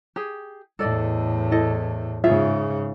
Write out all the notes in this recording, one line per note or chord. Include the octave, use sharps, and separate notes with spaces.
G4 G#4
E2 A2 A4 D5 D#5
E4 A4 D#5
G#2 C#3 F4 G#4 E5